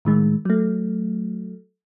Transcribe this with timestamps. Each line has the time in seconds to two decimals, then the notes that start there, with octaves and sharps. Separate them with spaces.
0.05 A2 D#3 G#3
0.45 F#3 A3